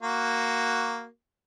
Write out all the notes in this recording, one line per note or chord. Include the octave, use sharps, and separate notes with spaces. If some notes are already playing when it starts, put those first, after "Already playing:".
A#3 F#4